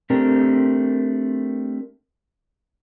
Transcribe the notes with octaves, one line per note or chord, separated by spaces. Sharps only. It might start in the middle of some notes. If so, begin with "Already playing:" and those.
A3 C4 D4 G4 A#4